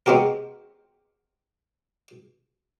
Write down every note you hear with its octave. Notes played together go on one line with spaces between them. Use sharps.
G#3 B3 C4 F#4 G4 A#4